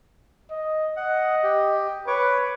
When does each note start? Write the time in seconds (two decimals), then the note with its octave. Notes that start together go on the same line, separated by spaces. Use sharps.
0.51 D#5
0.97 D#5 F#5
1.43 G4
2.07 B4 C#5 C#6 D6